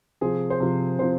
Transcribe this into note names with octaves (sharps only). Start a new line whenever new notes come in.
C3 F3 C4 G#4
C5
C3 F3 C4
C3 F3 C4 C5